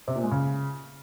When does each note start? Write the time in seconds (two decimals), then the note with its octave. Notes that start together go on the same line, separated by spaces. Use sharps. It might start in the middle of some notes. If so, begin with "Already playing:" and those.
0.08 C3
0.15 A#2
0.23 G#3
0.31 C#3